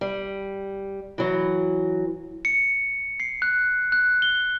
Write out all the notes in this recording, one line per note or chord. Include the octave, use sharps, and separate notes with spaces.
G3
E3 F#3
C#7
C7
F#6
F#6
G7